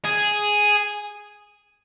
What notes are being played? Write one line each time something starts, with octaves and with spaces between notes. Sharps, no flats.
G#4